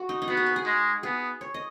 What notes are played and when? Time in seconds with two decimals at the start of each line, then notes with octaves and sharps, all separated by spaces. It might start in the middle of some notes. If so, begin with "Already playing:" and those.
Already playing: F#4
0.09 D#4
0.22 D#4
0.28 B3 F#4
0.37 G#4
0.46 B4
0.56 G#4
0.66 G#3
1.03 B3 G#4
1.41 C#5
1.54 D#5